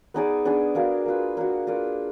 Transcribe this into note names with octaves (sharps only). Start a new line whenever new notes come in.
B3 D#4 G#4 D5
B3 D4 G#4
D4 F#4 A#4 F5
A#3 F4 B4
A#3 D4 F#4
A#3 F4 B4 D5